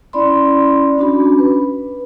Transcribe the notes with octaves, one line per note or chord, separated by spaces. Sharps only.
C#4 E4 D5 B5 C6
C#4 D4 F#4 B5
B4